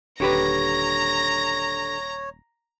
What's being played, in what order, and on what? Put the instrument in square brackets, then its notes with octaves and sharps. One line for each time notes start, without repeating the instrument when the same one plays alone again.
[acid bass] D#1 [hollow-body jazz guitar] D3 G4 B4 [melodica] C#5 [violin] A#5 A#6